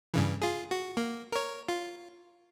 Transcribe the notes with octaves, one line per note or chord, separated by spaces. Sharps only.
G2 C#3 E3
F4 G#4
F#4
A#3
A#4 C#5
F4